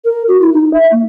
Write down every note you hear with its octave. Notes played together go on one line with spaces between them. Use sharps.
A#4
F#4
E4
D#4
E5
A#3